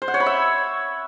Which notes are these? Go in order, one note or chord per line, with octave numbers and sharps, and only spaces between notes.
C5
F#5
C#5
B5
E5